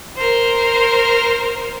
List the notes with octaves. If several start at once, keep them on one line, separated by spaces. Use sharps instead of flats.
A#4 C5